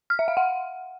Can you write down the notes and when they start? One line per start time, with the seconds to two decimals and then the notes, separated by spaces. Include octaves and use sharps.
0.10 F6
0.19 E5
0.28 F5
0.37 F#5